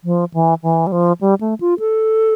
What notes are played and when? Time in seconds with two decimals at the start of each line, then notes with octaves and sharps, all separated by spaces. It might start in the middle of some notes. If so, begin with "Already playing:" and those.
0.04 F3
0.34 E3
0.63 E3
0.87 G3
0.92 F3
1.21 G3
1.41 A3
1.61 F4
1.79 A4